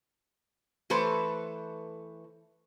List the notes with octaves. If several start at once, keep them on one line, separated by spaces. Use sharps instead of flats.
E3 A3 A4 B4 C5